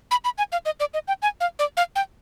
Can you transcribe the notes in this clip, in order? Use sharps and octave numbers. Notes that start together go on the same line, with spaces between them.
B5
B5
G#5
F5
D#5
D5
D#5
G5
G#5
F5
D5
F5
G5